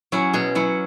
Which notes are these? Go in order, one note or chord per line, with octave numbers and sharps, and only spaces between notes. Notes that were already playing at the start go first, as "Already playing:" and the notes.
F#3 C#4 E4
B2 G#4
F#3 C#4 E4